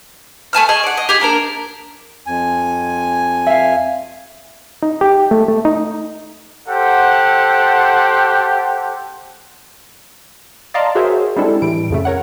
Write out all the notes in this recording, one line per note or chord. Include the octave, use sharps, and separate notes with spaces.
A3 G#5 A5 F6
G#4 D#5 C#6
D5 F#5
D#5
G4 G#4
A#3 D4 A#4
F2 G#5
E5 F5
D#4
G4
A3
A3
D#4
G4 A4 C5 F#5
D5 D#5 F5 A5 A#5 C6
F#4 G#4 A#4 C5 C#5 E5
G3 G#3 C4 D4 E4 A4
A2 E3 G3 D7
F2 C#3 A3
A#4 C#5 F#5